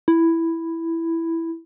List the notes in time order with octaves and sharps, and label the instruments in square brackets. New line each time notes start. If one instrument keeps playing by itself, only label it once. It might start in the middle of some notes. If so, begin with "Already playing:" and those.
[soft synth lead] E4